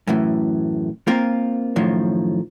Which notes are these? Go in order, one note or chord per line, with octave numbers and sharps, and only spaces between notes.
F#2 A2 E3
A#3 C4 F4 A#4
F#2 A2 D#3 F3